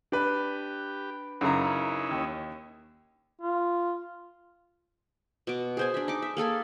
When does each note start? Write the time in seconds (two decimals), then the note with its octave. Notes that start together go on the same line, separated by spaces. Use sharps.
0.12 D4 G4 B4 B5
1.41 F#2 C#3 C#4 D#4 E4 A#5
2.11 D#2
3.41 F4
5.47 B2 D6
5.77 G#4 C5 G#5
5.94 D4 E5
6.08 D#4 D6
6.22 E5
6.37 A#3 G#4 A4 G#5